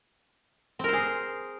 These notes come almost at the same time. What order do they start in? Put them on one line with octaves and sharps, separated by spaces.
C4 A#4 C5 G#4